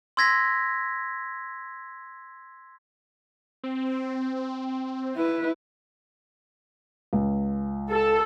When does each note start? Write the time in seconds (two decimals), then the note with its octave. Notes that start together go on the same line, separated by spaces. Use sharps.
0.17 C6 E6 G#6 A#6 B6
3.64 C4
5.16 E4 B4
7.13 C#2
7.91 A4